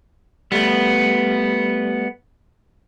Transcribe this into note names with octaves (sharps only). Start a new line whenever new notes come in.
G3 A3 B3